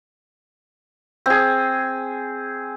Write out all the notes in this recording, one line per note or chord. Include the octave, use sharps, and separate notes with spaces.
C4 G#4